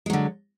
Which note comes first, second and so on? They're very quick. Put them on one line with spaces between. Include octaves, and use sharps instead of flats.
G#3 F#3 D3